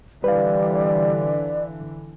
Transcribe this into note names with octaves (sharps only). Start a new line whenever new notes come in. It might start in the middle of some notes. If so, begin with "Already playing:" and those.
D3 E3 G3 B4 D5 F5